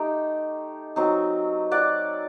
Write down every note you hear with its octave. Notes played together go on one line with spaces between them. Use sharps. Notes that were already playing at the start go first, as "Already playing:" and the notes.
Already playing: A3 D#4 G4
F#3 C4 D#4
D5 F#5